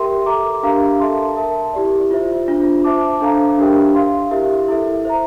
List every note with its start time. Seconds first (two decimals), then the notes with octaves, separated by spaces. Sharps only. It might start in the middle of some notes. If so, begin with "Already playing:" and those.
Already playing: G4 A#4 E5 G5 C6
0.26 A4 E5 A#5 D6
0.63 D4 G4 A#4 F5 A#5
1.00 A4 E5 A5 C6
1.37 A#4 E5 A5
1.73 E4 G4 D5
2.11 F4 C5 E5
2.48 D4 F4 C5
2.84 C5 E5 A5 D6
3.21 D4 A4 C5 F5 A#5
3.58 D4 G4 A#4 E5 G5
3.95 A#4 F5 C6
4.31 E4 G4 A#4 E5
4.68 E4 A4 E5
5.05 C5 E5 A#5